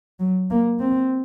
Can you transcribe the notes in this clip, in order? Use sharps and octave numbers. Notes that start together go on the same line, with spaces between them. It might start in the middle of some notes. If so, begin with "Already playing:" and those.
F#3
A#3
C4